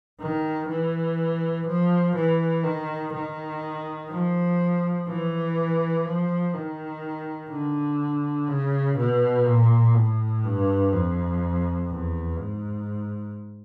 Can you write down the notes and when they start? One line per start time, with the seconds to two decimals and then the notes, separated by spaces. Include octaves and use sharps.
0.21 D#3
0.69 E3
1.67 F3
2.15 E3
2.64 D#3
3.13 D#3
4.10 F3
5.07 E3
6.05 F3
6.54 D#3
7.51 D3
8.48 C#3
8.98 B2
9.46 A#2
9.94 A2
10.44 G2
10.92 F2
11.89 E2
12.38 G#2